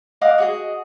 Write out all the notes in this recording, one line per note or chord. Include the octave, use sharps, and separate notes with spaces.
D#5 F5 F#5 D6
F#4 G#4 D#5